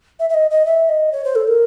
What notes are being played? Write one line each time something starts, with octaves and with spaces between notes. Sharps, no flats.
E5
E5
D#5
D#5
E5
D#5
C#5
C5
A4
A#4